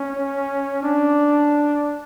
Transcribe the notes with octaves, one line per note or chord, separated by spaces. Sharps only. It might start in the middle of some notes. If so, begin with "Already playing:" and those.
Already playing: C#4
D4